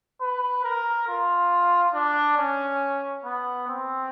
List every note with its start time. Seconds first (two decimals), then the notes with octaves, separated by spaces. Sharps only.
0.21 B4
0.64 A#4
1.08 F4
1.94 D4
2.37 C#4
3.25 B3
3.69 C4